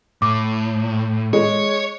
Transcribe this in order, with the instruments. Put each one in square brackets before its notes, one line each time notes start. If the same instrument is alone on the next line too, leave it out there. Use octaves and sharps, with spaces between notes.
[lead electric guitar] A2 [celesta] D6
[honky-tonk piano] G#3 [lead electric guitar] C#5